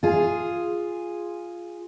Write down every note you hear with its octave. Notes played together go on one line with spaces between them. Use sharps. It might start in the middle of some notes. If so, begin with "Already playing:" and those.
F4 G#4